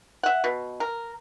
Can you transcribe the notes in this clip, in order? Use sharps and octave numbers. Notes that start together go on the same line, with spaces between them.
E5 F#5
B2
A#4